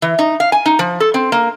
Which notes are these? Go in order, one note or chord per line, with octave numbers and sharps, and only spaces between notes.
E3
D#4
F5
G#5
D#4
F3
A4
C4
A#3